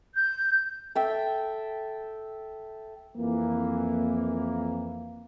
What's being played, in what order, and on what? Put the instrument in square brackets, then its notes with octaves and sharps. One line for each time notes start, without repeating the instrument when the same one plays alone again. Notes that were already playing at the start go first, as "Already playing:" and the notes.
[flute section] G6
[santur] A4 E5 G5
[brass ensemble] F2 E3 A#3